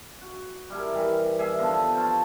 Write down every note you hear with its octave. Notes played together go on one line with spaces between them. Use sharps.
F#4
G3 E4 A#4
D#3 E3 G3
G3 G#4 E5
D3 F3 B3
C5 C#5 F5 A5